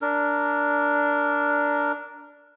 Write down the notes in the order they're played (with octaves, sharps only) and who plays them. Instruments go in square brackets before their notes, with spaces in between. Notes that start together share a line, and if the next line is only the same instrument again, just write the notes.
[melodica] D4 A#4